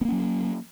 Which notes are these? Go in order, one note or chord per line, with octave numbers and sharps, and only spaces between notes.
F#3 A#3 B3 C#4